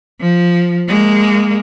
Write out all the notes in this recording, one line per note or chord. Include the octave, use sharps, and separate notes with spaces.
F3
G#3 A#3